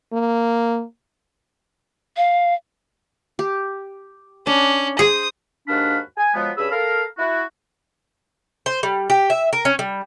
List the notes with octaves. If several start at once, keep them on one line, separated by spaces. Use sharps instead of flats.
A#3
F5
G4
C#4 D4
G#4 C5 D#6
D#2 G#2 D4 F#4 F5 B5
G#5
F3 F#3 G#3 B3
G2 C#4 G#4 B5 E6
A4 A#4 F5
E4 F#4
C5
G3
G4
E5
A#4
C#4
G3